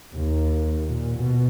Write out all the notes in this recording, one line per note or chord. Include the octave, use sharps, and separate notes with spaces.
D#2
A#2
B2